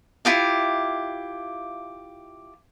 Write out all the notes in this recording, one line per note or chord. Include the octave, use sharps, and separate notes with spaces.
E4 F4 G4 F5